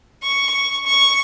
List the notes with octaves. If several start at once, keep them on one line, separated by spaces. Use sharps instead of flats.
C#6
C#6